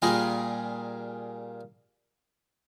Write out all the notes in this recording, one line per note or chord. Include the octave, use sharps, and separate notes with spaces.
A#2 G3 F4 G#4 A#4